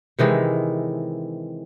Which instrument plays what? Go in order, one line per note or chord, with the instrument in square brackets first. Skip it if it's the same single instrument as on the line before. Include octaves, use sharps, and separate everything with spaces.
[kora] C3 D#3 E3 G#3